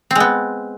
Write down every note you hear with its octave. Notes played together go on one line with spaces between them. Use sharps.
G#3 B3 C4